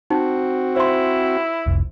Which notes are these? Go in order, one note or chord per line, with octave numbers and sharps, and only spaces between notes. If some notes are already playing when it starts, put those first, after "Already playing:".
C4 D#4 F#4
E4 C5 C6
F1 C2